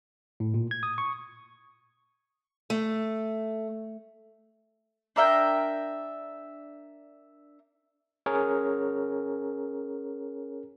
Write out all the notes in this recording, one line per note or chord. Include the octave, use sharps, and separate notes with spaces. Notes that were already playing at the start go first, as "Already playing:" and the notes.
A2
A#2
G#6
D#6
C#6
A3
D4 A#4 E5 G5
C#4 G#4 A#4 C#5